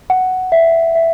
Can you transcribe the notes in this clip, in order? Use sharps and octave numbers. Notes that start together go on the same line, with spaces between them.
F#5
E5
E5